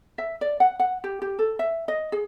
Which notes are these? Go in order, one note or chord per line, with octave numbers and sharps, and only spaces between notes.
E5
D5
F#5
F#5
G4
G4
A4
E5
D#5
G#4